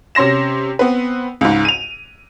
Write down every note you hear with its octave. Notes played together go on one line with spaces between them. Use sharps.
C3 C#4 C6 A#6 E7
B3 C4 B4
C#2 G#2
D#7 F7